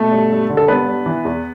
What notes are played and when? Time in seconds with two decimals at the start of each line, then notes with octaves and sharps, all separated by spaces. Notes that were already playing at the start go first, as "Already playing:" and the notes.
Already playing: B2 A3 A4
0.12 G2
0.31 G2
0.50 D3
0.57 A4
0.68 G2 B3 B4
0.87 G2
1.06 E3
1.25 E2